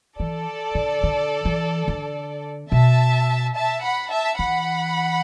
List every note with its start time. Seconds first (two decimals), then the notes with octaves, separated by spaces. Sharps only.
0.18 E3 A4 D5
0.75 D3
1.03 D3
1.45 E3
1.88 D3
2.71 B2 E5 A5
3.56 E5 A5
3.83 F#5 B5
4.11 E5 A5
4.39 E3 F#5 B5